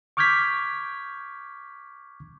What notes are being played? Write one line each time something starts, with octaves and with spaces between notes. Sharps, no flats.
C#6 D6 F6 G6 G#6 B6